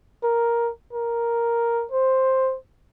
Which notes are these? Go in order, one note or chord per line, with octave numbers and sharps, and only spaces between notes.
A#4
A#4
C5